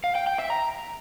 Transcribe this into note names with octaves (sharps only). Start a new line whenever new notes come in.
F5
G5
G5
E5
A#5